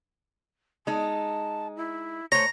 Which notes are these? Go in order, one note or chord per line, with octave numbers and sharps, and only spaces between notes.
G#3 D#4 A5
E4
A3 C5 C#5 A#5